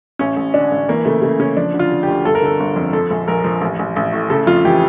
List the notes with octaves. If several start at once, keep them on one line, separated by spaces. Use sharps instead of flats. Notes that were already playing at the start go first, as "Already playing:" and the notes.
A1 C#4
A1
D3 D4
A1
E3 A#3
C#3 A3
C#3 A3
C#3 C#4
F3 D4
D3
F4
D3
G4
D2
G1 A4
A#4
D3 A4
G1
F2
F3 A4
A#1
A#1 A#4
F3
A1
A1
A1
A2
C#3 A4
F2 F4
E3 G4